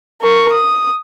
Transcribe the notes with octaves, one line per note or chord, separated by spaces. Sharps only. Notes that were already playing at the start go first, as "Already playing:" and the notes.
A#4 C#6
D#6